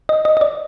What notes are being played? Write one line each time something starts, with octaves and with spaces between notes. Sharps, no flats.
D#5
D#5
D#5
D5